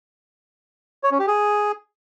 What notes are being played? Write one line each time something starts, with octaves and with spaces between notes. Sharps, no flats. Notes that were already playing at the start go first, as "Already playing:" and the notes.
C#5
C#4
G4
G#4